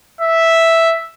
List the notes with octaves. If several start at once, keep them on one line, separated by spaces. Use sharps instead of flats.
E5